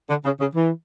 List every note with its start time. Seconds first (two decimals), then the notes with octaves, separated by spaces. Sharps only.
0.10 D3
0.25 C#3
0.40 C#3
0.55 E3